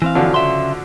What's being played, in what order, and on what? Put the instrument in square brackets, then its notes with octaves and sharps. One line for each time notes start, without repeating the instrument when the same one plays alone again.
[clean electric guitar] E3 C4 F5
[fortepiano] D3 F3 F#3
[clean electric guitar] C#3 E5 C6